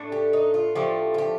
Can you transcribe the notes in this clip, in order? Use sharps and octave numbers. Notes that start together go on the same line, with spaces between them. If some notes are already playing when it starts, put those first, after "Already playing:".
Already playing: A2 A3 D4
G4
D#4
F4
A2 F3 A3 D4 G4
F4
G4